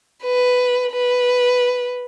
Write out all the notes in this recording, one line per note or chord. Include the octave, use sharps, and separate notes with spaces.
B4
B4